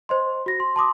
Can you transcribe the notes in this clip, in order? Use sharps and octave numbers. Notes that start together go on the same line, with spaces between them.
C5 D#5 C6
F#4 A#6
C6
A5 C6 D6 D#6